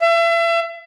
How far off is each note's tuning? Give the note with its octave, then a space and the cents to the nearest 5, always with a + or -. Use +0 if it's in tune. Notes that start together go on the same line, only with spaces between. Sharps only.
E5 +35